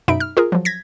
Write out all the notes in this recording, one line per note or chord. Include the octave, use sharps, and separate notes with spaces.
F#2 B2 D#4 E5 B5 D7
F6
F4 G#4 A#4
F3 F#3
G#6 A#6 B6